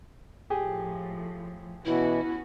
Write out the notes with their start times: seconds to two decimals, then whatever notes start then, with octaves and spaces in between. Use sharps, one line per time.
0.50 A2 F3 G4 G#4
1.85 B2 E3 B3 C#4 E4 F#4